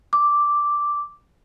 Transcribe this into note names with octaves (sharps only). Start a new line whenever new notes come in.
D6